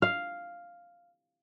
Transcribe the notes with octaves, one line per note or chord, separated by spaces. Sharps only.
F5